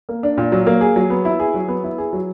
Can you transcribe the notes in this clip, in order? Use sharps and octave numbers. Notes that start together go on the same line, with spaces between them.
A#3
D4
A#2
F#3
A#3
G#4
F#3
B3
E4
G#4
F#3
B3
E4
G#4
F#3